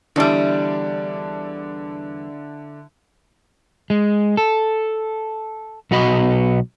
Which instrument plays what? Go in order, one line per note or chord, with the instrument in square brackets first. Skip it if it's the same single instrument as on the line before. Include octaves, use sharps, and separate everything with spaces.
[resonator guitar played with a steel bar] E2 G3 [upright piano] D3 D4 E4
[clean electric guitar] G#3
A4
B1 B3 F#4 D#5 B5